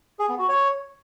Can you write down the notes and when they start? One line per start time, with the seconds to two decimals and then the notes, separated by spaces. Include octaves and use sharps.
0.19 G#4
0.29 B3
0.39 F#4
0.49 C#5